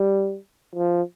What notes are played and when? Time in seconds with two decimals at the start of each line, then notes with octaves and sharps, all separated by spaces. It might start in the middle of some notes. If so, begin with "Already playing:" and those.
Already playing: G3
0.76 F3